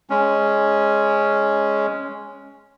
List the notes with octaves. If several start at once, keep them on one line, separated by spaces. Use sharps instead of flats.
G#3 C#4